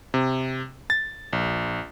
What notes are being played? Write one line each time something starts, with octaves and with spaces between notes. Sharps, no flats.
C3
A6
A#1